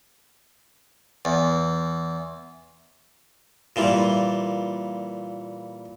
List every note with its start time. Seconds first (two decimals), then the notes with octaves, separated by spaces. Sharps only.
1.25 E2
3.76 A#2 E3 G3